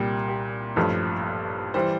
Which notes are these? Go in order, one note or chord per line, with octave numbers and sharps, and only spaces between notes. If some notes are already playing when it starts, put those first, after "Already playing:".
Already playing: C2 A#2 G3
G4
A1 G2 F3 A4
E3 G3 C5